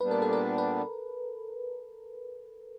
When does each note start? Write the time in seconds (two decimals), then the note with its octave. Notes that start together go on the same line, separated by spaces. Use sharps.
0.01 A#2 G3 B3 D4 B4
0.11 A#4
0.22 A4
0.33 A#4
0.58 B4